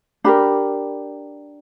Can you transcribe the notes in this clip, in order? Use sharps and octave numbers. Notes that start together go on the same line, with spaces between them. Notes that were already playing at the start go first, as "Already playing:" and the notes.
D4 G4 A#4 B5